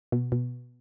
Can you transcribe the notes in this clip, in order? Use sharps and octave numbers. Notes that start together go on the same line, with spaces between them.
B2
B2